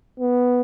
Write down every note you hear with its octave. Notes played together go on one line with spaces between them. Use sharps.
B3